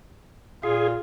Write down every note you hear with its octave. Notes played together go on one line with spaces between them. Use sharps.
A#2 F4 G#4